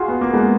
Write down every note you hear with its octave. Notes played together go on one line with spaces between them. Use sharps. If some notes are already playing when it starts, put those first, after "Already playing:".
Already playing: F4 F#4 G#4
B3
A#3
G#3 B3